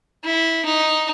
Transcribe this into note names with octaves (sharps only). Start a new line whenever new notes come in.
E4
D#4